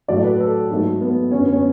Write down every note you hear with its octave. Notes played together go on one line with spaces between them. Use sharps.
A2 F#3 A3 D5
B4
A4
G#2 F#3 A3
B3
F#2 D3 A3 C#4
B3
C#4